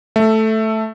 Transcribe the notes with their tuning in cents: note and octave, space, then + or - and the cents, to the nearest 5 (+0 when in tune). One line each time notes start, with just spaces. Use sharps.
A3 +0 E5 +0